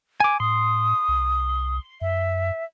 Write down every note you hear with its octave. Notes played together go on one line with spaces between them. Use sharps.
G#5 D6
A2 C6 D#6
C2
F#2 E5